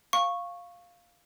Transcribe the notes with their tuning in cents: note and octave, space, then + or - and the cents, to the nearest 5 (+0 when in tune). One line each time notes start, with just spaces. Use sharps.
F5 +0 C#6 -10